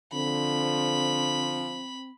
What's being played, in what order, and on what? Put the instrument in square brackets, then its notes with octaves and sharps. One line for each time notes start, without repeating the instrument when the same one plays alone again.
[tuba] D3 [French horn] F3 [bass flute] C4 [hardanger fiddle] B5